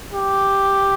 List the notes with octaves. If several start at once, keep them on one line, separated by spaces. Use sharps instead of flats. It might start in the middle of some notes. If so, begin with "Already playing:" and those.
G4